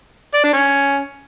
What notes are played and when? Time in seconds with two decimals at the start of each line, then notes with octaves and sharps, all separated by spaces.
0.34 D5
0.43 D4
0.53 C#4